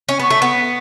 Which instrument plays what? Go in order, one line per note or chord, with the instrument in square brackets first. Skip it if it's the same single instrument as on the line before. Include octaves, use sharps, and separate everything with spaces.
[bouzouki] C#4
[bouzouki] B3 [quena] C#6
[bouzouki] A3
B3